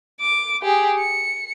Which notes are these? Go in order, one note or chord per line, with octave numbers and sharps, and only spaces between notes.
D6
G4 G#4
C#7